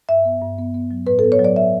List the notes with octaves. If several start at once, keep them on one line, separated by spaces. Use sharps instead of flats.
G2 E5
B3
G2
B3
B3
F#3
A2 B4
A4
B3
C#5
F#3
D5
E5